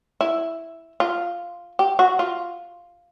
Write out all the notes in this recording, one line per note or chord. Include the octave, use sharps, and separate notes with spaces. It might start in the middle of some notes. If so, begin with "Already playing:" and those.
E4
F4
G4
F#4
F4